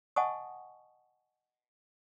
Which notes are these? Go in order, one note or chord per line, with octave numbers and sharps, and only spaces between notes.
D#5 F#5 G#5 A5 C#6 D#6